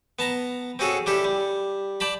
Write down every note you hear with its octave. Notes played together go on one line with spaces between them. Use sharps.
B3 A5 A#5
C4 C#4 F#4 G#4 A4
D4 E4 G4 A4
G3
D5 G5 A5 B5